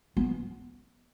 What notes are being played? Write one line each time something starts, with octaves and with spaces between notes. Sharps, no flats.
B3